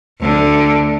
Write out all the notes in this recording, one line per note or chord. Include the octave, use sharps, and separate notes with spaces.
D2 D3